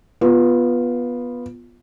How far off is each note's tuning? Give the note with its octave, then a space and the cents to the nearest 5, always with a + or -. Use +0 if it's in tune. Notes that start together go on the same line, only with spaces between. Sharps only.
B3 -10 F4 +0